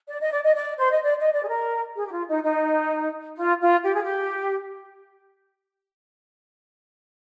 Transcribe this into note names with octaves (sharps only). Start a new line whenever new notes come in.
D5
D#5
D5
D#5
D5
C5
D#5
D5
D#5
D5
G#4
A#4
G#4
G4
F4
D#4
D#4
F4
F4
G4
G#4
G4